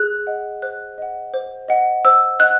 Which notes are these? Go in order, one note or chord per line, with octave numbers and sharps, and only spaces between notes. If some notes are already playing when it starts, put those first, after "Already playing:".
Already playing: G#4 F#6
D#5 F#5
C5 F#6
D#5 F#5
C5
D#5 F#5
C5 E6
D#5 F#5 F#6